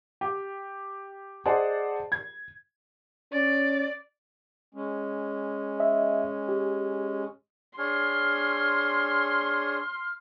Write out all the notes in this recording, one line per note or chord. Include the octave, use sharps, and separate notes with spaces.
G4
G#4 C5 D5 D#5 F#5 A5
G#6
C#4 D5
G#3 C#4
D#5 E5
G4
D4 G#4 C#5 C6 F6